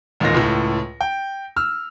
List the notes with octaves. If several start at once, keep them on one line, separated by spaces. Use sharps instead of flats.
A1 D#2 A#2 G#3 A#3 A#6
C#2 A2
G5
E6 F6